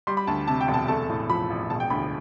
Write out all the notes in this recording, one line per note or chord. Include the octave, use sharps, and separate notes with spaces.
G3 C6
B5
D2 A5
C3 A5
G5
E1
A5
A3 A5
A2
F3 B5
A1
E1 A5
G5
D2 B5